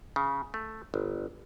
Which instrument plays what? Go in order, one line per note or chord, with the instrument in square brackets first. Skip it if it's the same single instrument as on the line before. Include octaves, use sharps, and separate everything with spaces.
[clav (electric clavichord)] C#3
A3
G1